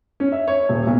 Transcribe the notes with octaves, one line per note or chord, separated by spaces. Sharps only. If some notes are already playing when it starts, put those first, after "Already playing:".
C#4
E5
C#5
D#1
B1